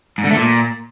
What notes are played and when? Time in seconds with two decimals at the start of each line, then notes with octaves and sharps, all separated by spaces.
0.18 G#2
0.24 D3
0.30 A3
0.37 A#2